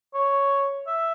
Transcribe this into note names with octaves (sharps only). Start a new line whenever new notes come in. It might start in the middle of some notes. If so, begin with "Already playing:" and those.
C#5
E5